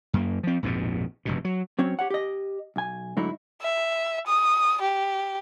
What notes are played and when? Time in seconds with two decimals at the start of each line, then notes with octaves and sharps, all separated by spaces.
0.13 F#2 A#3
0.43 F3 C4
0.63 A#1 F2 G#2 B2
1.25 F1 G2 B2
1.45 F#3
1.79 F#3 C4 C#4 C#5
1.99 G4 C#5 F#5
2.10 G4 D#5
2.76 B1 G#5
3.17 G#2 D3 F#3 A3 D#4 E4
3.61 E5
4.26 D#6
4.81 G4